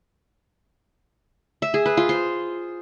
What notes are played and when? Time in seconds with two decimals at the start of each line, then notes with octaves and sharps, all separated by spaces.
1.62 E5
1.74 G#4
1.86 B4
1.97 F4
2.09 C5